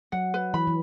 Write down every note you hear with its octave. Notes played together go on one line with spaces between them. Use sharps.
F#3 F#5
B4
E3 B5
E3